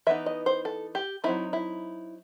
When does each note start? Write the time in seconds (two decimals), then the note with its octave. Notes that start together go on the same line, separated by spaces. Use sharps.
0.07 E3 B3 D#4 E5
0.26 D#5
0.46 C5
0.65 A4
0.95 G4
1.24 F#3 C4 D#4 E4
1.53 E4